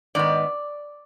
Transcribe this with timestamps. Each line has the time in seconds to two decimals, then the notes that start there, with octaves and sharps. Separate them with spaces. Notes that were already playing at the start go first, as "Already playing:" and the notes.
0.15 G#2 D#3 B3 D5